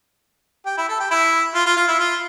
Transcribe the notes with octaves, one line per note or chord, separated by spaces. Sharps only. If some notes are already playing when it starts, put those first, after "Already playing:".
G4
E4
A4
G4
E4
F4
F4
F4
E4
F4